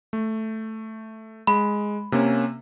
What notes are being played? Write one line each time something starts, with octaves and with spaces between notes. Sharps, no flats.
A3
G#3 B5
C3 A#3 C#4